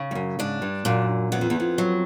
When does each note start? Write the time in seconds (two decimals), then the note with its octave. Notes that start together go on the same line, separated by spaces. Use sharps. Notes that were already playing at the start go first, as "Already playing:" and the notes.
Already playing: C#3
0.11 G2
0.15 F#2
0.39 G#2 D4
0.62 G2
0.85 F#2 A#2
1.32 F#2 B3
1.41 F2
1.50 E2
1.60 F2
1.78 F#3